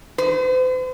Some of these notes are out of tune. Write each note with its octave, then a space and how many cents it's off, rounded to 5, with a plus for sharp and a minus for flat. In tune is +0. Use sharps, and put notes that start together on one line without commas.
C5 -45